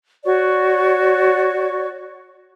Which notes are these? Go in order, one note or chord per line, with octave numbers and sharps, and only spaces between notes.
F#4 C#5 D5 C#6